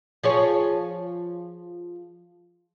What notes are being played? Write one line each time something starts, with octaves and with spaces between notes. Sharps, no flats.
F3 G#4 C#5